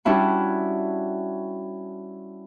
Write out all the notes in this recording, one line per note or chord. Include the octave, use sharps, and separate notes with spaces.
G3 C#4 D4 E4 F#4